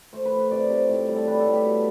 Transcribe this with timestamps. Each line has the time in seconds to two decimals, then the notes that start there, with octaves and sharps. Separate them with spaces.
0.13 A3 C5
0.25 B4
0.32 F3
0.38 B4
0.51 C3 D5
0.70 C3
0.89 A2
1.08 G3
1.16 A4
1.27 G3 B4
1.40 A4
1.46 A2
1.53 G4
1.65 B2